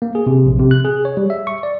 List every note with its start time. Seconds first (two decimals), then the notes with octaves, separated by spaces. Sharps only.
0.02 A#3
0.15 G#4
0.27 C3
0.46 A#1
0.59 C3
0.71 F#6
0.85 G#4
1.05 C#5
1.17 G3
1.30 E5
1.47 C#6
1.63 D5